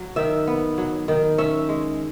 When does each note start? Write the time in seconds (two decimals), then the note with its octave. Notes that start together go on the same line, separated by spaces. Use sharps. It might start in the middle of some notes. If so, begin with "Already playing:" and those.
Already playing: F#3
0.16 D#3 E5
0.47 B3
0.78 F#3
1.08 D#3
1.38 C#4 E5
1.69 G#3